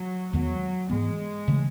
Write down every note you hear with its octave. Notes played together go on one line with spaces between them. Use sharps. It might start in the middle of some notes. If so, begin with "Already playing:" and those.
Already playing: F#3
E2 D#3 F#3 G#3 B3
G#2 E3 G#3 B3
C#3 E3 A3